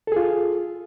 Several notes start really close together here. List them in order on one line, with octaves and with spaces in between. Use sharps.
A4 G#4 F4